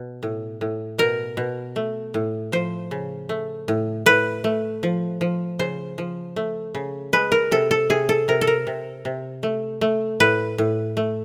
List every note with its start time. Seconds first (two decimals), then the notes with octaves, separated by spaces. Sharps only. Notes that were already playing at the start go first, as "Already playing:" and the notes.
Already playing: B2
0.23 A2
0.61 A2
0.98 B2 A#4
1.37 B2
1.76 A3
2.14 A2
2.52 F3 C5
2.91 C#3
3.29 A3
3.68 A2
4.06 A2 B4
4.44 A3
4.83 F3
5.21 F3
5.59 C#3 C5
5.98 F3
6.36 A3
6.75 C#3
7.13 G#3 B4
7.32 A#4
7.51 C3 A4
7.71 A4
7.90 C3 G#4
8.09 A4
8.28 C3 A#4
8.41 A4
8.47 A#4
8.67 C3
9.05 C3
9.43 A3
9.81 A3
10.20 A2 B4
10.58 A2
10.97 A3